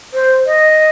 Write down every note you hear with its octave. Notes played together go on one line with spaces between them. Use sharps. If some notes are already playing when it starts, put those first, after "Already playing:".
C5
D#5